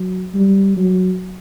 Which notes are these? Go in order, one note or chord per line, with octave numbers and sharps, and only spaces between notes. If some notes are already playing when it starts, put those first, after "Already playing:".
Already playing: F#3
G3
F#3